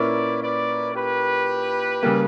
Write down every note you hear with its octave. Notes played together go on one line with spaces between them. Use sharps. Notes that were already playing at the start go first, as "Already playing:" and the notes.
Already playing: A#2 A#3 C#4 E4 B4 D5
B4 D5
G4 B4
C#3 G3 A#3